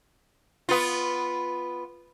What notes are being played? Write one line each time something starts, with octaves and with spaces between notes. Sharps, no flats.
B3 F4